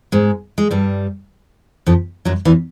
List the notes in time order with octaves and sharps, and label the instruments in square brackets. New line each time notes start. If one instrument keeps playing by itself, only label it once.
[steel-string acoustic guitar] G#2 G#3
G#3
G2 G3
F2 F3
F#2 F#3
E2 E3